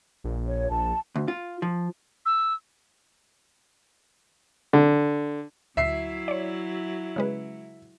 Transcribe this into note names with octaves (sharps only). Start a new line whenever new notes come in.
A#1
C#5
A#1 A5
D2
F4
F3
E6
D3
D2 F#3 E4 E5 C7
C#5 D5
C#3 G#3 B4